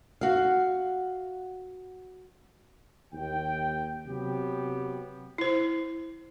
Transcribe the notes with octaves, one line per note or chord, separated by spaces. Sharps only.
F#4 F5
D#2 G5
C3 F#3 B3 G4
E4 C5